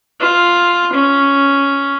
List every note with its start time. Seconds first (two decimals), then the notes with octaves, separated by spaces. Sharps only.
0.20 F4
0.93 C#4